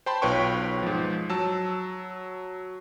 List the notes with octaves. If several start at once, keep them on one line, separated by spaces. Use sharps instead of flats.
C5 G5 A5 B5 C6
B1 F4 B4 C#5 G5 C#6
G#2 F3
F#3 A5 E6